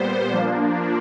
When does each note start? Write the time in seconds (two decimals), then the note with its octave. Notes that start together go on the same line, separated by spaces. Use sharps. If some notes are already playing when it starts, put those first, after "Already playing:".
Already playing: A#2 G3 B3 C5
0.31 F3 A#3 D4